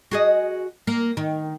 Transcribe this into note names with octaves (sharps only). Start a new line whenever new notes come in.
F#4 G#4 D#5
A#3
D#3